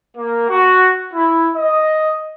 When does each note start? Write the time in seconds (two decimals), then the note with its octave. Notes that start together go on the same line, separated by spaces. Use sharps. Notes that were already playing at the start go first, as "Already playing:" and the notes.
0.17 A#3
0.49 F#4
1.13 E4
1.56 D#5